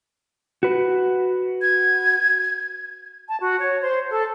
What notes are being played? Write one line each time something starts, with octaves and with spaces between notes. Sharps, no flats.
F#4 B4
G#6
A5
F#4
C#5
C5
A4